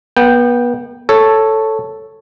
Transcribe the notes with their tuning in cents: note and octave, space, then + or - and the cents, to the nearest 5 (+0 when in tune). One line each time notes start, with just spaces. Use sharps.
B3 -30 G5 +0
A4 +0 C#5 +0